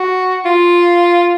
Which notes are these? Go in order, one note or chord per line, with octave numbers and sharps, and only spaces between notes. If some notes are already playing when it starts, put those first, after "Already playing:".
Already playing: F#4
F4